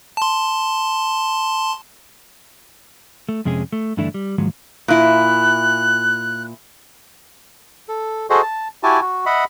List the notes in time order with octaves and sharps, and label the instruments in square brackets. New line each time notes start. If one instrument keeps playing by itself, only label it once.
[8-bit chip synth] A5 C6
[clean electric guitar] A3
F2 C3 G#3 C#4 G#4
A3
G2 D3 E3 A3 D4 E4
G3
D#2 G#2 F3 F#3 G#3
[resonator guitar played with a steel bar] A#2 E4 [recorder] F#6
[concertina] A4
F#4 G#4 A4 C5 D#5
A5
E4 F#4 G4 G#5 A5
F#4
D#5 E5 F#5 B5